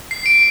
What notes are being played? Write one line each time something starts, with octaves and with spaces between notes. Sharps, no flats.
C7
D7